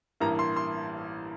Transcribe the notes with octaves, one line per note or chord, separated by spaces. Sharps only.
A1 G2 E3 A#3 A#5
C6
C6